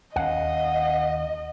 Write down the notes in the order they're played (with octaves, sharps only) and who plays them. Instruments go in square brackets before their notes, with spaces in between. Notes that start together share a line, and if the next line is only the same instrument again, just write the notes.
[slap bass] D#2 C#4 [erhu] D#5 [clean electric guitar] F5 F#5